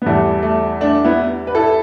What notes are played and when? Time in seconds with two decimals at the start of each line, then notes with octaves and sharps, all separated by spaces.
0.02 B3
0.06 E2 E3 G3 A3
0.43 A3
0.81 A3 D4
1.05 B3 E4
1.47 B4
1.55 E4 A4